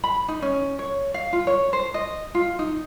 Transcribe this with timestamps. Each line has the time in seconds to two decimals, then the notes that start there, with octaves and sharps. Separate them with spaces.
0.04 B5
0.28 D#4
0.42 C#4
0.79 C#5
1.14 F5
1.33 F4
1.47 C#5
1.73 C5
1.94 D#5
2.35 F4
2.59 D#4